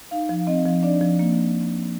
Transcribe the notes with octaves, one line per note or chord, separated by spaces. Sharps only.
D#4 F5
F3
C4 D#5
F3
D4 D5
F3
A#3